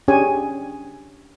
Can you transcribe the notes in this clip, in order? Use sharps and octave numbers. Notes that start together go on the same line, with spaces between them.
C#4 D4 G4 G#4 C#5 G#5